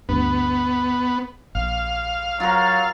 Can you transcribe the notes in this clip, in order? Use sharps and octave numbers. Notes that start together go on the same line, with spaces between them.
D2 G2 B3
A#1 F5
F#3 F4 A#4